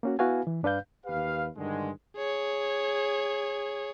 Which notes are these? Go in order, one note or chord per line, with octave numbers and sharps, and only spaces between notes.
A#3 C#4 F#4
B3 E4 F#4 B4 F5 G#5
E3
G2 D4 B4 F5 G6
D#2 G4 B4 F5
G2 D3 D#3 G#3
G#4 C#5